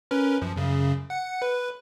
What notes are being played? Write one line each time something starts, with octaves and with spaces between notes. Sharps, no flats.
C#4 A#4 B4
F#2 F3
F#2 C#3
F#5 C#7
B4